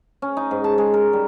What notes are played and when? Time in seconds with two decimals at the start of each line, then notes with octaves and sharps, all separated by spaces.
0.22 C#4
0.37 D#4
0.51 G#2
0.64 A5
0.78 G#3
0.94 A#4
1.13 G3